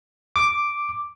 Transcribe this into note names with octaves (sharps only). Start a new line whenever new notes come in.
D6